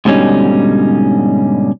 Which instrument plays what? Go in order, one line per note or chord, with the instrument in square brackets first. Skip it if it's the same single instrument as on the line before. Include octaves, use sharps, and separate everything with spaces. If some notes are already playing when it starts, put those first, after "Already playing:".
[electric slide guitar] G#2 B2 D3 G3 C#4 D#4